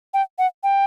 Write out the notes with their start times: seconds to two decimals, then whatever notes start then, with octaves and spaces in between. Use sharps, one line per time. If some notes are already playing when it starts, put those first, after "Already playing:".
0.14 G5
0.39 F#5
0.64 G5